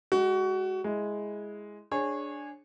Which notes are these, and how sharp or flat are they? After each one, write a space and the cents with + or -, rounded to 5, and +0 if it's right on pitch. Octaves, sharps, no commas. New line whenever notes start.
G#3 +0 F#4 +25
G#3 +0 E4 +0
D4 +0 G#4 +0 C#5 -20